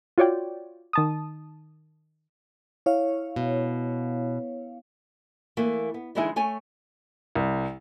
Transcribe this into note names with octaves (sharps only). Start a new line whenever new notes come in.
F4 F#4 C#5 D5 G5
D#3 A5 D#6
E4 C#5 F5
B2
E3 A3 A#3
B3
D3 E3 G#3 D#4 E4 G#4
A3 C#5 G#5
C2